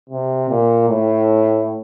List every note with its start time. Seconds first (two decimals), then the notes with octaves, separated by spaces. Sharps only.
0.09 C3
0.49 A#2
0.89 A2